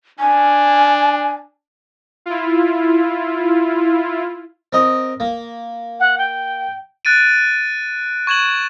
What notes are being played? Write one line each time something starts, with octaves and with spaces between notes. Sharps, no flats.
D4 G#5
E4 F4
C4 A#4 D#5
A#3
F#5
G5
F#6 A6 D7 D#7
C#6 G#6 E7 F#7